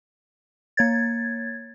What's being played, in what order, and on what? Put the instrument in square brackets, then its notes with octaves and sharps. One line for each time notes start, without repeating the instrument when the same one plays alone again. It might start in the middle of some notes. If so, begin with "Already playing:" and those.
[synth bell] A#3 C#5 G#6 A6